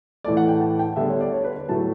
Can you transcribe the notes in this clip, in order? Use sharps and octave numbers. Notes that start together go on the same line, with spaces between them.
A2 E3 A3 D5
F#5
G5
A5
G5
D3 G3 B3 E5
C#5
D5
C#5
B4
B4
A2 F#3 A3 A5